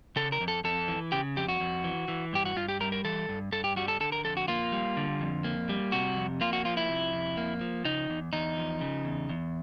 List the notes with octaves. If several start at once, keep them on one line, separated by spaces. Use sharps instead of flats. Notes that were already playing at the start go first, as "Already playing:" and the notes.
C#3 A4
A#4
F2
A4
F2 A4
E3
C#3 G4
F2 G4
F#4
F2
E3
E3
G2 G4
F#4
G2 F4
G4
G3 A#4
A#4
E3 A4
G2
G2 A4
G4
G3 F#4
A4
D3 A4
A#4
F2 A4
F#4
A#3 F4
G3
D3
F2
A#3
G3
C3 F#4
F2
A#3 F4
F#4
F3 F4
E4
C3
F2
A#3
F3
C#3 D#4
E2
E2 D#4
F3
C#3
E2
E2